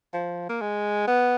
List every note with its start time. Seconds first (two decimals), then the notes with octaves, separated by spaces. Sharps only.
0.13 F3
0.49 A#3
0.61 G#3
1.07 B3